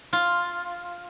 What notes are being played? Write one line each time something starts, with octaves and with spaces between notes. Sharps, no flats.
F4